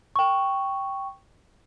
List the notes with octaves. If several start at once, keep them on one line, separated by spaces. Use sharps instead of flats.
G5 C#6